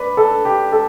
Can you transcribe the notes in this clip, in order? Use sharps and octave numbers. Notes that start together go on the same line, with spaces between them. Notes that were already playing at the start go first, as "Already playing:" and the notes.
Already playing: B4 D5
A4
G4
A4